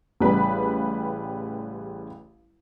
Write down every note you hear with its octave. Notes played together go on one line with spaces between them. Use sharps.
A1 C#3 G3 B4 B5